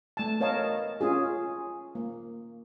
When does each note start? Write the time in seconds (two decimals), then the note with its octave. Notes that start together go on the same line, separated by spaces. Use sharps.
0.17 A3 A5
0.40 B3 A#4 C#5 D#5 F5 A5
1.01 C#4 F4 G#4
1.95 A#3